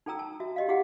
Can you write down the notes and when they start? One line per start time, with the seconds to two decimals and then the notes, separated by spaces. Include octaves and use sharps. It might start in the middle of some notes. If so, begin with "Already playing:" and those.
0.06 D#4 A4 G5 A#5 E6
0.19 A5
0.40 F#4 E5
0.56 G4 D#5 F5
0.68 E4 G4 G#4 F5 F#5